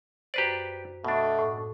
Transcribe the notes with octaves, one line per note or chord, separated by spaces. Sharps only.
F#2 G4 B4 C5 D5
B2 A3 D4
A2